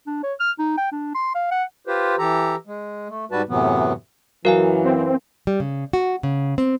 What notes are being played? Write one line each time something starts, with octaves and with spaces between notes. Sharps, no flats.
D4
C#5
F6
D#4
G5
D4
C6
F5
F#5
F4 G4 B4 C5
E3 G4 A4 A#5
G#3
A3
G#2 G3 F#4 B4 A5
F#2 A2 C3 E3 F#3 B3
F#2 E3 F#3 A#4 F5 G#5
C4
G3
C#3
F#4
C#3
C4